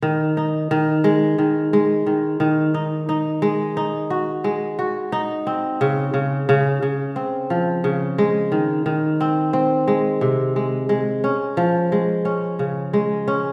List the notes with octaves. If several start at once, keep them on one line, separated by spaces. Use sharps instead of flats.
D#3
D#4
D#3
G#3
D#3
G#3
D#3
D#3
D#4
D#4
G#3
D#4
F#4
G#3
F#4
D#4
C4
C#3
C#3
C#3
C#3
C4
F3
C#3
G#3
D#3
D#3
C4
C4
G#3
C3
G#3
G#3
C#4
F3
G#3
C#4
C#3
G#3
C#4